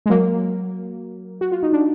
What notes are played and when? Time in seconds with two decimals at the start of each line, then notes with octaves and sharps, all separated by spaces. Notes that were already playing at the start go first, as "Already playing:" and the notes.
0.06 G#3
0.09 F#3 A#3
1.41 F#4
1.52 F4
1.63 D#4
1.73 D4